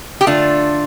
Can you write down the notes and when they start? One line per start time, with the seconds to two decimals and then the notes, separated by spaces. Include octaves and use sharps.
0.21 G4
0.27 D3 A3 D4 F4